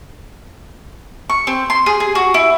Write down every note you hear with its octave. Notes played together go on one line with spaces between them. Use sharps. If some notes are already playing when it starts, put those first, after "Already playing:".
C#6
C4
C6
G#4
G#4
F#4
E4